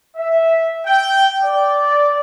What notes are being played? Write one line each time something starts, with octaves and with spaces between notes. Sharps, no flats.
E5
G5
D5